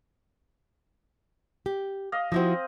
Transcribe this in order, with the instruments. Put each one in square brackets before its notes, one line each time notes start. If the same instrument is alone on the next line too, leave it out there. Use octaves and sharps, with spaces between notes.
[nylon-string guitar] G4
[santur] D#5 F5
[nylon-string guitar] F3 E4 F#4 [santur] C4 D#5